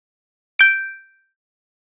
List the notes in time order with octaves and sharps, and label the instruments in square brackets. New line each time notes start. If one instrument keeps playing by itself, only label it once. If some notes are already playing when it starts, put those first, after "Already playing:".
[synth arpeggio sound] G6 D7